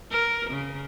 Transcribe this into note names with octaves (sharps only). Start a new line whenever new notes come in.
A#4
C#3